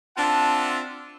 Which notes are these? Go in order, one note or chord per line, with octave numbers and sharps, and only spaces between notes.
C4 D4 F4 E5 F#5 A5